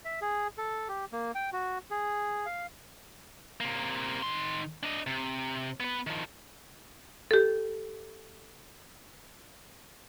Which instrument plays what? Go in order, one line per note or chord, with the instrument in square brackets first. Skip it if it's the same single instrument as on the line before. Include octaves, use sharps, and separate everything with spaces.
[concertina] E5
G#4
A4
G4
A#3
G5
F#4
G#4
F5
[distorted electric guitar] C3 A#3
D#3 C6
D4 D#5
C3
B3 B4
D#3 F3
[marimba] G4 A4